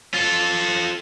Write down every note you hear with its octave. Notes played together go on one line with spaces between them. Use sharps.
F4 A4